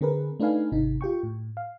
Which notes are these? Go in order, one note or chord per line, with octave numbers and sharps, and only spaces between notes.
D3 C4 G#4 A#4 B4
A3 D4 D#4 B4 F5 G#5
G#1 C3 D#4
F4 G4 G5 C#6
A2
F5